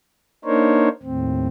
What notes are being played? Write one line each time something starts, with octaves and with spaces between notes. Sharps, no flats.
A#3 D4 D#4 A#4 C5 C#5
D#2 A2 C4